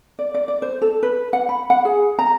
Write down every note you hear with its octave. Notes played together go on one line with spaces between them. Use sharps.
D5
D5
D5
C5
A4
B4
F#5
B5
F#5
G#4
A#5